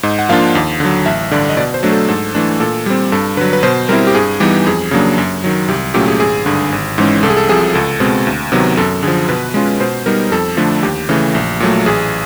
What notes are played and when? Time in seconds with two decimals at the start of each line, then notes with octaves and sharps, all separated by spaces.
0.03 G#2 D#5
0.19 F#5
0.29 F3 A#3 D4 F4 F5
0.55 D#2
0.80 D3 F#3
1.06 A1 E5
1.31 G2 D3 D5
1.49 D#5
1.57 B2 D5
1.74 C5
1.83 F#3 A3 D4
1.92 A4
2.08 G#2 A4
2.35 E3 A3 D4
2.60 A#2 A4
2.86 G3 C4
3.12 G2 A4
3.37 D3 B4
3.41 F#3
3.53 B4
3.63 B2 C5
3.89 G3 C4 E4 A#4
4.07 G4
4.15 G2 G#4
4.40 E3 G3 B3 D#4 G4
4.67 F2 G#4
4.91 C#3 F#3 A#3 D4
5.18 F#2
5.44 D#3 F#3
5.68 C2 G4
5.94 A#2 F#3 A3 C#4 G4
6.08 G#4
6.20 G#1 G#4
6.46 G2 D3
6.72 G#1
6.98 G#2 E3 G#3 C#4
7.23 C2 A4
7.30 G#4
7.37 A4
7.49 C3 F3 G#4
7.74 C#2 A4
8.00 B2 G#3 C4
8.27 D2
8.52 C3 D#3 F#3 B3
8.77 F#2 A4
9.03 D3 G#4
9.08 F3
9.29 B2 B4
9.54 G#3 C#4 F4
9.80 B2 C5
10.06 G3 B3 D#4 A#4
10.32 F2 A4
10.57 D3 F3 A3 D4
10.83 D#2 G4
11.09 C#3 E3 A3
11.35 A#1
11.60 A#2 F#3 A3
11.86 A1 G#4